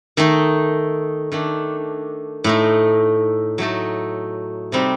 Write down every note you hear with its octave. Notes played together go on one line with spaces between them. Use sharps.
D#3 A3 D#4
D#3 A3 D4
A2 A3 D#4
F#3 A3 D#4 A4
C3 G3 C4 D#4